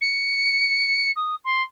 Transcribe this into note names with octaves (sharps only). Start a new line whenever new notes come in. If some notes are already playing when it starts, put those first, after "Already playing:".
C#7
D#6
C6